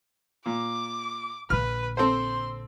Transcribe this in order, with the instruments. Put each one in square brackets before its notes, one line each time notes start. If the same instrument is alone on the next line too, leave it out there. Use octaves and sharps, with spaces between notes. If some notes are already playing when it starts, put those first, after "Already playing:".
[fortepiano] A#2 [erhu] D6
[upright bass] A#1 D3 [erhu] B4 [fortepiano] F6
[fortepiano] C4 A4 C5 [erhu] C6